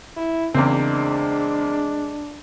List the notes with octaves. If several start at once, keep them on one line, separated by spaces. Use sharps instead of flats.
E4
E2 C#3 G#3 A#3 C4 D4